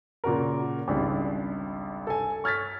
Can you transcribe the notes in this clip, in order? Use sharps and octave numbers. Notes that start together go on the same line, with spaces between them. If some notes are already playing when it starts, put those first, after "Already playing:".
A#2 C#3 F#4 A#4
G#1 C#2 G3 D4 B5
A4 G#5
C#6 F6 G#6 A6 B6